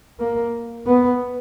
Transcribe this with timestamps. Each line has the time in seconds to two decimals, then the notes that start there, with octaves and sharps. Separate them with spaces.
0.20 A#3
0.87 B3